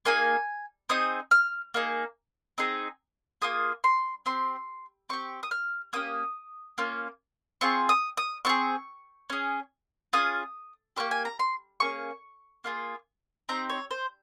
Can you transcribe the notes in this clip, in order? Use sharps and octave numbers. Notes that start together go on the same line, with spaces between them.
A#3 D#4 G#4 G#5
C4 D#4 G#4 D#6
F6
A#3 D#4 G#4
C4 D#4 G#4
A#3 F4 G#4 D#6
C6
C4 G4 C6
C4 G4 C#6
D#6
F6
A#3 C#4 G4 D#6
A#3 C#4 F4
C4 F4 G#4 C#6
D#6
D#6
C4 F4 G#4 C#6
C#4 G#4
C#4 F4 G#4 D#6
A#3 C#4 G4 C#6
G#5
A#5
C6
A#3 C#4 G#4 C#6
A#3 F4 G#4
C4 D#4 G4 A#5
C#5
C5